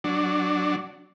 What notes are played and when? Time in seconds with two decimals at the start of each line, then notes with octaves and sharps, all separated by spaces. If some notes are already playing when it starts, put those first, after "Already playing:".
0.04 F#3 D4